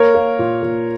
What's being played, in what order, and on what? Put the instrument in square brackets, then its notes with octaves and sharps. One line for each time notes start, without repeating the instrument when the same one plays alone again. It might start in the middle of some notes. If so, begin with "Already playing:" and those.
Already playing: [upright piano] A#3 A#4 C#5
A#3
A#2
A#2